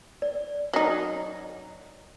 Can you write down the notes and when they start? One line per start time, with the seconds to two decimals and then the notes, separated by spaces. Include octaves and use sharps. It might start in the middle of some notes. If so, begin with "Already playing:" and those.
0.22 D5
0.73 F#3 D#4